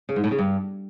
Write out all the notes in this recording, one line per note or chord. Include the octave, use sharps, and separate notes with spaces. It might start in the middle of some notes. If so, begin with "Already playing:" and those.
C#3
G#2
A2
C#3
G2